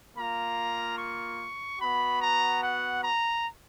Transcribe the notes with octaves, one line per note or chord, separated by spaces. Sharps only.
A#3 F4 A#5
C#6
B3 F#4 B5
A#5
F#5
A#5